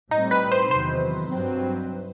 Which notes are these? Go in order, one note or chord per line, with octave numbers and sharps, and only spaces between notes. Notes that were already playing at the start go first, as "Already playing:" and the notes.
A2 G3 C4 D#4
B4
C5
E2 C3 D#3 F#3 C5
G2 F#3 C4